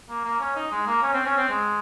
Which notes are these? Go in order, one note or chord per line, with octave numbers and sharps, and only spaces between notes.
A#3
A#3
C#4
D#4
G#3
A#3
C#4
C4
C#4
C4
G#3